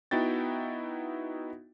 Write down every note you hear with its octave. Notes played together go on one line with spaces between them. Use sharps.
B3 D#4 E4 F#4 G5 A6